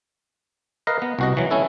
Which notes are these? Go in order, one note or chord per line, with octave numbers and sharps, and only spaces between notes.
A#4 B4 D#5 F5
B3
C2 F#4 D#5
E3 F#3
A3 C#4 E4 A4